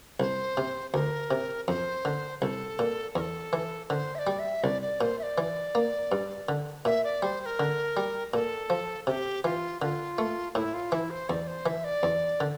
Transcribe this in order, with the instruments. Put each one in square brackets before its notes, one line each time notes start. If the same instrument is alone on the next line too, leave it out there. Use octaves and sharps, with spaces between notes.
[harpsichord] C2 [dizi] C5
[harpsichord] C3
[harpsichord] D2 [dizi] A#4
[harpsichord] C3
[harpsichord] F2 [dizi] C5
[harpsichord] D3
[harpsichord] C2 [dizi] A4
[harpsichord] A#2
[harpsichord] E2 [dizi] A#4
[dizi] A4
[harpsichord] E3
[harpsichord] D3 [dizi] C5
[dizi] E5
D5
[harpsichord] G3
[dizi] E5
[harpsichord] C2 [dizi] D5
[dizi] D5
[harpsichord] A#2 [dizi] C5
[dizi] E5
D5
[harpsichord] E3
A#3
G2
D3
[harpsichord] A#2 [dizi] E5
[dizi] D5
[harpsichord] G3 [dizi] C5
[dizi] C5
A#4
[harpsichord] D3
G3
[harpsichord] A#2 [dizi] A4
[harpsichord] F3
[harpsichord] C3 [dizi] G4
[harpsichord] E3 [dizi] F4
[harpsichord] D3 [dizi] F4
[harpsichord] A3
[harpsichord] A2 [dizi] E4
[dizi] F4
[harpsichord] E3 [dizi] E4
[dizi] C5
[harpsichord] E2 [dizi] D5
[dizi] C5
[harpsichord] E3 [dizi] E5
[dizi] D5
[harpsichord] E2
D3